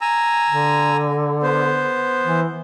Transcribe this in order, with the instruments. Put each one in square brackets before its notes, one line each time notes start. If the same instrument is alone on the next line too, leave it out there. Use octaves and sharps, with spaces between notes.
[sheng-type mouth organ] G#5 A#5 E6
[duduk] D3
[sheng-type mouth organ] B3 C5
[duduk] E3